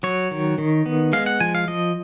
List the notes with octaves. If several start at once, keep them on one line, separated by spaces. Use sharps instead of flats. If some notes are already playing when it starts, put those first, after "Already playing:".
F#3 C#5
D#3
D#3
B3
G#3 F5
F#5
F3 G#5
F5
F3 D#5